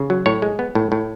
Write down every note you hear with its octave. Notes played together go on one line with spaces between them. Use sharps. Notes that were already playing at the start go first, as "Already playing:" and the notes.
Already playing: C#3
F#3
A2 C#5
G#3
B3
A2
A2